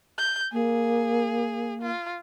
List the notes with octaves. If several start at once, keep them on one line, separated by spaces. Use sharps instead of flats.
G6
A#3 G#4
F4